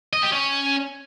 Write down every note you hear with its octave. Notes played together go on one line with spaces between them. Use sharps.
D#5
G4
C#4